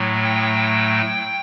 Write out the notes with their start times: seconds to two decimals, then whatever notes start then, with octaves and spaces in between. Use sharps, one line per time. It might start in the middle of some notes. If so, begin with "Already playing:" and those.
Already playing: A2 F#3 A3
0.24 G5